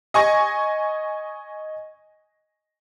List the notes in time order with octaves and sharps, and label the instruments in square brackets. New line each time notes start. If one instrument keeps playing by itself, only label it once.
[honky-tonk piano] D#5 G#5 C#6 A#6